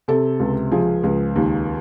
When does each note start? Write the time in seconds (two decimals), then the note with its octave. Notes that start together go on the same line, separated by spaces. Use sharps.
0.08 C3 A4
0.40 C#2
0.72 F3 G#4
1.04 C#2
1.36 D#2